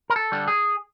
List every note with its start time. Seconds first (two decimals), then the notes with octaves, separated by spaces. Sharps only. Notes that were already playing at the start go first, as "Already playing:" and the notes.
0.10 A#4
0.16 A4
0.32 D3 G3
0.48 G#4